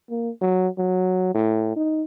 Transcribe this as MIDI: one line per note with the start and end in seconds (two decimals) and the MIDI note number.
0.10 0.30 58
0.41 0.68 54
0.78 1.34 54
1.35 1.72 45
1.76 2.05 63